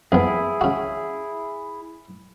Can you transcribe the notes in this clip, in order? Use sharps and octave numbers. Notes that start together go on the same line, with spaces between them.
F2 B3 E4 G#4
C#3 F#4